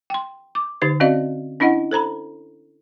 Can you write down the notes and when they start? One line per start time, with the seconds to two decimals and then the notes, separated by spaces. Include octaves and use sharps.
0.10 G5 C6
0.55 D6
0.82 D3 D#4 G4 C5
1.00 C4 C#4 F#4 D5 D#5 F5
1.60 C#4 D4 E4 D#5 F#5
1.91 A4 C5 A#5 B5